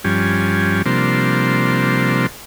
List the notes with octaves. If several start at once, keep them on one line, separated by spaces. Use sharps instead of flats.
G2 F3 G3 C#4 G#5
C3 F3 G3 A#3 D4 C5